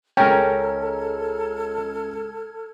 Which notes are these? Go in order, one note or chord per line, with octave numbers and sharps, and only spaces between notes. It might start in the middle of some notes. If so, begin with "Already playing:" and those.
C#2 C#4 A4 A#4 G5 A#5 F6 G#6